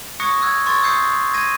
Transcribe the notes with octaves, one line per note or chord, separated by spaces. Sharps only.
C#6 D#6 F#6 G#6 A#6 C#7
E6 F#6 G#6
C6 C#6 G#6 A6
D#6 E6 G6 C7 C#7
G#6 A#6 D#7